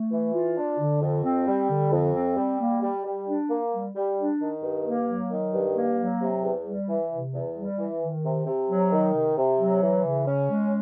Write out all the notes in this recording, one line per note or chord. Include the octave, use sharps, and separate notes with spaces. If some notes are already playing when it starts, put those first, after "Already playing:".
Already playing: A3
E3
F4
D4
D3
F2
C4
G3
D3
F2
C4
G3
A#3
G3
G3
D4
A#3
G3
G3
D4
D#3
G2
A#3
F#3
D#3
G2
A#3
F#3
C3
E2
G3
E3
C3
E2
G3
E3
D#3
C3
C3
F#3
D#3
C3
C3
F#3
E3
C#3
C#4
G#3